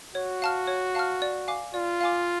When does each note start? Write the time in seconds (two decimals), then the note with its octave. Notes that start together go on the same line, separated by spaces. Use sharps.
0.15 F#4 C#5
0.42 F5 A5 F6
0.67 C#5
0.95 F5 A5 F6
1.22 D5
1.48 F5 G#5 D6
1.74 F4 D5
2.01 F5 G#5 D6